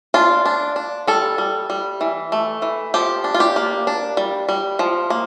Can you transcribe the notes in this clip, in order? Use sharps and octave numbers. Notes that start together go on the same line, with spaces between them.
D4 F4
D4
D4
G3 A4
G3
G3
E3
A3
E3
F3 G4
D4
F4
G4
A#3
D4
G3
G3
F3
A#3